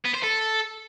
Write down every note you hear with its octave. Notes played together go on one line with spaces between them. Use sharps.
B3
C5
A4